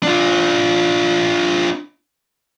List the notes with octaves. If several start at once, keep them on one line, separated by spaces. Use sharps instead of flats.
D4 F4